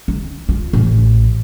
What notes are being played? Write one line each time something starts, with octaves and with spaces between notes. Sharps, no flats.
D#4
F4
A1